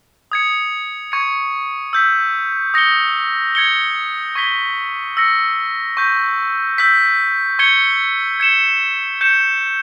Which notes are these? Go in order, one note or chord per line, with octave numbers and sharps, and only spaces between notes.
D#6 G#6 C#7
C#6 G#6 C#7
E6 G6 B6
D#6 A#6 C#7 G7
G#6 C#7 G7
C#6 G#6 B6 G7
E6 A#6 C#7
C#6 G6 B6
E6 G6 B6
C#6 G#6 C#7 G7
G#6 C#7 E7 G7
G6 C#7 E7